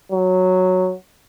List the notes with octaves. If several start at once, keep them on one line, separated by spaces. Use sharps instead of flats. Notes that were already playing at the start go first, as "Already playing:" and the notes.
F#3